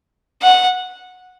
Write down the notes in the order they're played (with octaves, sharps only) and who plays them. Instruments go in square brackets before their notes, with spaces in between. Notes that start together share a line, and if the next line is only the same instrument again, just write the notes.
[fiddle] F#5